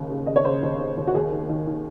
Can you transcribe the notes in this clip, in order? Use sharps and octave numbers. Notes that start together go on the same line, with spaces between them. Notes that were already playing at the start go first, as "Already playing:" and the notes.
Already playing: D#2 C#3
C#3
C#3 D#5
C#5
C#3 C5
D#2
C#3
D#2
F#4
D#2 G#4
D#3
D#3
D#3